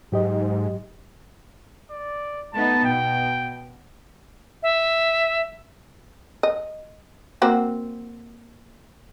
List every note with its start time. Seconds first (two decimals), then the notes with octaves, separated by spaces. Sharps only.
0.12 G#2 F#3 G4 D#5
1.91 D5
2.54 A3 B3 D#4 A5
2.85 B2 G5
4.63 E5
6.43 D#5
7.42 A#3 C4 F#4